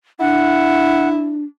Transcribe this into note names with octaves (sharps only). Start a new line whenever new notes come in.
D4 E4 F#5